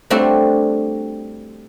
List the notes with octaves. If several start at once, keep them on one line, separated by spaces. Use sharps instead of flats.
G3 A3 C4 D4 F#4